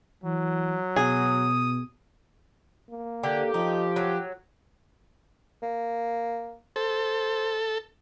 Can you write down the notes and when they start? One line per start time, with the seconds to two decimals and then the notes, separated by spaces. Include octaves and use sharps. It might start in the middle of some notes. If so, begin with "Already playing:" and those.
0.24 E3 F#3
0.96 B2 G#4 D#6
2.90 A#3
3.23 D3 G4
3.54 F3 D#4
3.96 F#3
5.63 A#3
6.76 A4 C5